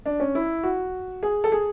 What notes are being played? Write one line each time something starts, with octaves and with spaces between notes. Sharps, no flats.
D4
C#4
E4
F#4
G#4
A4
G#4